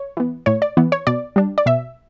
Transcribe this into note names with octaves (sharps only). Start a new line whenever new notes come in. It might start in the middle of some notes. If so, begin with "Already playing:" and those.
Already playing: C#5
E3 B3
A2 C#5
D5
E3 B3
C#5
B2 D5
G3 D4
D5
B2 E5